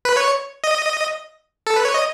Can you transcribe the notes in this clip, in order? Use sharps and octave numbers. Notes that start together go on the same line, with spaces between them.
B4
C#5
D#5
A4
B4
C#5
D#5